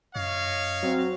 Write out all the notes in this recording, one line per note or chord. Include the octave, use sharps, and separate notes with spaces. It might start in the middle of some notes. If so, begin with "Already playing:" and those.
F#2 C#5 D#5 F5
F#3 C4